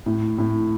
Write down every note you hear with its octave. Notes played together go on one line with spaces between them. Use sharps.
A2
A2